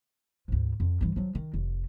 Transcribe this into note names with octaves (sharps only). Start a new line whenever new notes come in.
D2 G#2
F2
G2 E3
F3 F#3
D#3
F1